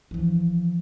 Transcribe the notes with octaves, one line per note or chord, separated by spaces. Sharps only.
E3 F3